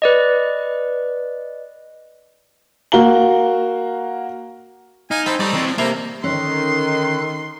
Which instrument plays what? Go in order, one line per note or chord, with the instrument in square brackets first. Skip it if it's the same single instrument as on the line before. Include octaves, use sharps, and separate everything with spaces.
[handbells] B4 D5 D#5
[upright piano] A#3 F#4 F5 A#5 G7
[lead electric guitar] D#4 [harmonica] F5 G#5
[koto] C4 [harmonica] A5 B5
[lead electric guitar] G3 [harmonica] D#4 A4 C#5 [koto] D5
[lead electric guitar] E3 C4
[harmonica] F3 G#3
[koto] C3 [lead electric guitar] A#3 [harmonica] A4 A#5 B5
[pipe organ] D3 A4 F#6 [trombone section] D#3 [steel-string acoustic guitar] C#4 D#4 [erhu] C6